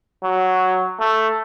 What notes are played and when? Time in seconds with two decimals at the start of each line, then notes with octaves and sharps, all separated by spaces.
0.24 F#3
1.00 A3